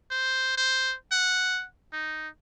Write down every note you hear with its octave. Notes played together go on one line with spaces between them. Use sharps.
C5
C5
F#5
D#4